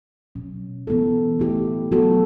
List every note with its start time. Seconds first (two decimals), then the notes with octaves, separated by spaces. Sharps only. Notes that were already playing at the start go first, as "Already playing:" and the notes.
0.35 B2 F#3 C#4
0.87 E3 B3 E4 A4
1.39 A3 E4 G4
1.92 F#3 B3 F#4 A4